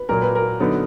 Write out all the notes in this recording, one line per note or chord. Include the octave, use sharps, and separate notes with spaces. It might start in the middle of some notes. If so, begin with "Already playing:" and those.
Already playing: B4
A#2 F#3 A#3 A#4
B4
A#4
D3 F#3 B3 D#4